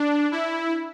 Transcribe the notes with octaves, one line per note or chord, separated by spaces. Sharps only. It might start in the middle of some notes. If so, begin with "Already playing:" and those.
Already playing: D4
E4